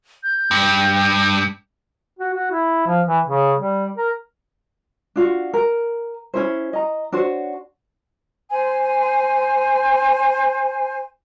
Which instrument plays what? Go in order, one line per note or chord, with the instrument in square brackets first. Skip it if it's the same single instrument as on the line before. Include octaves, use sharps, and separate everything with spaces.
[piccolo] G6
[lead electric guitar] G2
[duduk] F#4
F#4
E4
F3
E3
C#3
G3
A#4
[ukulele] D4 F4 F#4
A#4
C#4 E4 C5
D#5 A#5
D4 F#4 C5 C#5
[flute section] C5 G#5